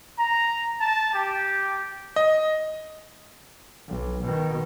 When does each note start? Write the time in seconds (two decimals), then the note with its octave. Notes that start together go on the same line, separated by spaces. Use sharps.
0.19 A#5
0.80 A5
1.13 G4
2.16 D#5
3.88 B1
4.25 B2 D#3